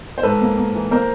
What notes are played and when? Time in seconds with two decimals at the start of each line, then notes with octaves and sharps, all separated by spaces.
0.18 C5
0.23 G#2 A4 B4
0.41 A#3
0.57 A#3
0.75 E3
0.91 A#3 A#4 C5